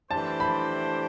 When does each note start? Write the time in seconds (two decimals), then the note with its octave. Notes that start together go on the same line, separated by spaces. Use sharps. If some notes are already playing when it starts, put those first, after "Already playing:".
0.11 E3 A3 D4 G4 C5 A5
0.40 B5